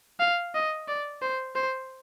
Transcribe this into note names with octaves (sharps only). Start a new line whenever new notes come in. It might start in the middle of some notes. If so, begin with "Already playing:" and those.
F5
D#5
D5
C5
C5